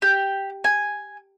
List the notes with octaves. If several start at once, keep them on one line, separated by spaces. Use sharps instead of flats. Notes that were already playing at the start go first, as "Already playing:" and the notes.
G4
G#5